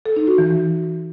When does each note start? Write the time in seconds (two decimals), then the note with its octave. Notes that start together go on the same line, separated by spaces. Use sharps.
0.06 A4
0.16 D#4
0.27 F#4
0.38 E3